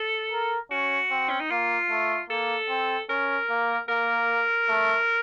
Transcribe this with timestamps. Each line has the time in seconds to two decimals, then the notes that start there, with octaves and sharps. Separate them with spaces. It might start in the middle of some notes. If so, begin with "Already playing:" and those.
Already playing: A4
0.31 A#4
0.71 C#4 F#4
1.11 C4
1.30 C#4
1.40 D#4
1.51 A#3 F4
1.90 A3
2.30 A#3 A4
2.69 C4
3.09 C#4 A#4
3.50 A#3
3.89 A#3 A#4
4.69 A3